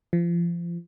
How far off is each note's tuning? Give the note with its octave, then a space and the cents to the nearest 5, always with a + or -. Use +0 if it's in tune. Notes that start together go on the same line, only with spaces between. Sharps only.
F3 -30